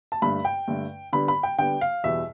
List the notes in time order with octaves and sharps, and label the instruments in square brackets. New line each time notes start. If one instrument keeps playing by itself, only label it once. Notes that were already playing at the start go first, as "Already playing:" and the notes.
[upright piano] A5
G2 D3 A3 B5
G5
G2 D3 A3
D3 G3 B3 B5
B5
G5
D3 G3 B3 G5
F5
E2 B2 G3 B3 E5